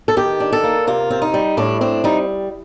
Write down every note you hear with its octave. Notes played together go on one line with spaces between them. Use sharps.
A4
D#3 G4
D4
A4
A#3
C3 F4
C4
D#4
G3
A2 D4
C4 D4
G3 D#4